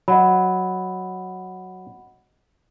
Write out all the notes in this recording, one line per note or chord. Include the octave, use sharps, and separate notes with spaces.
F#3 D#5 F#5 B5